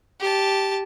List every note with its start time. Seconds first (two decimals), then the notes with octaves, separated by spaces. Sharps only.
0.20 G4 A5